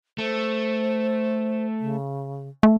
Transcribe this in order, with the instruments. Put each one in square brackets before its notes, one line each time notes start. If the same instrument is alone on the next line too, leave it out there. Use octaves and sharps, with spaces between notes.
[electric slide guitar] A3 [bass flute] C5
[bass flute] C#3
[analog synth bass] A3 [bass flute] E5